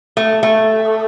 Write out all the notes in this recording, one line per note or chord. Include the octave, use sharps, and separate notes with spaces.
A3
A3